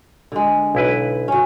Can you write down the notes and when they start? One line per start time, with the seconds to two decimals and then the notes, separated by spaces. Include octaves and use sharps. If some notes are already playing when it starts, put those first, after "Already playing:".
0.32 D3 G#3
0.75 B1 E4 B4
1.28 C#4 F#4